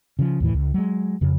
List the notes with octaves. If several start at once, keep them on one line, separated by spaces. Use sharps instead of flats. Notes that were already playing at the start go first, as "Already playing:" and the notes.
C#3 F3
D#2 A2 E3
C#2
F#3 G#3
F2 C#3